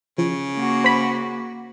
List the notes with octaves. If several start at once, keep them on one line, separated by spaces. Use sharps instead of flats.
C#3 F3
A#3 F#4
C5 B5